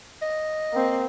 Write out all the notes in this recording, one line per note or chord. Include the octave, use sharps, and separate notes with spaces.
D#5
A#3 C4